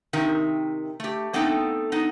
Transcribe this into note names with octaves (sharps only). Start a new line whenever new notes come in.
C3 D#3 D#4 A#4 E5
A3 G4
A3 B3 C4 D#4 A4 G5
B3 D#4